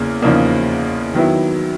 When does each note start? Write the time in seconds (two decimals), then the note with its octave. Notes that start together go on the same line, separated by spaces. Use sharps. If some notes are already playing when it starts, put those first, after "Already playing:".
Already playing: E2 C#3 A#3
0.22 E2 C#3 F3 A#3 D#4
1.14 D#3 F#3 B3 E4